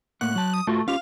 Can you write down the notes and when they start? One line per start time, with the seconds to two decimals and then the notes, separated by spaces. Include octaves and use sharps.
0.21 A2 A#3 F#5 F#6
0.36 F#3 A5
0.54 D#6
0.67 A2 A3 F4 F#4
0.88 C#4 F4 G4 F5